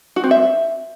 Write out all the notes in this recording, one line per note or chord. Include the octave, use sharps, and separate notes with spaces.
F#4
C4
E5